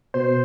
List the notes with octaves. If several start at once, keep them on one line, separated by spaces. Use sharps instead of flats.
B2 C5